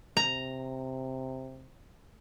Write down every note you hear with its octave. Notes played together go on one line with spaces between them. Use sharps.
C3 A#5